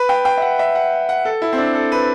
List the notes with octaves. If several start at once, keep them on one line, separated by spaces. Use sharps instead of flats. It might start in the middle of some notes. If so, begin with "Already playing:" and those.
Already playing: B4
G5
G5
E5
F#5
E5
F#5
F#5
A4
E4
C4
D4
A4
B4